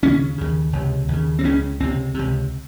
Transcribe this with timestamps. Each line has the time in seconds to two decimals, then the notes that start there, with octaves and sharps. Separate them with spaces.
0.03 D#2 C#3 C#4
0.38 D#2 C#3
0.73 C#2 C3
1.08 D#2
1.13 C#3
1.39 C4
1.44 C#2 C#3 C#4
1.80 C#2 C3 C4
2.14 C#2 C3